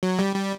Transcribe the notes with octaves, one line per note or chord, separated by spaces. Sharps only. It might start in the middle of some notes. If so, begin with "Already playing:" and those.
F#3
G3
G3